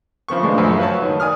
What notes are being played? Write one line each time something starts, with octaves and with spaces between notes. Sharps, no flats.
C#3 F3 B3 C#6
A2 G#3 D4
F#2 C#3 F3
B4 C#5 A5
D#3
D5 G#5 D#6 F6